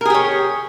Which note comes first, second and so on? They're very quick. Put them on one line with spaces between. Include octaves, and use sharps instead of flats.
A#4 G#4 G4 C#5